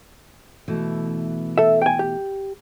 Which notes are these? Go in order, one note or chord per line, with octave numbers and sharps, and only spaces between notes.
B2 E3 A3
A4 E5
G5 G#5
G4